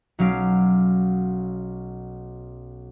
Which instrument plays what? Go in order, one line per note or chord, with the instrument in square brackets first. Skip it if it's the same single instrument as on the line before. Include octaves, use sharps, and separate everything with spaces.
[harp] B1 F#3 C#4 F5 D6 C7